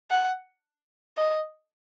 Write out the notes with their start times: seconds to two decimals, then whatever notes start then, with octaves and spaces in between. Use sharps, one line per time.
0.11 F#5
1.18 D#5